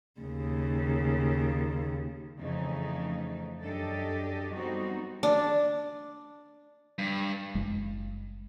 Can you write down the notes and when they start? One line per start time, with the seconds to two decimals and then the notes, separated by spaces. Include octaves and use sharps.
0.20 D#2 C#3
2.38 F2 C#3 E3 A3 D#4
3.63 F#2 D4 G4 A4 D#5
4.53 F#3 G3 B3 C4 D#4 F#4
5.23 D4
6.99 G2
7.55 F#1 G#3